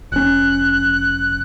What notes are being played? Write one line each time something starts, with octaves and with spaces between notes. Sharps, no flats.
F1 C#4 F#6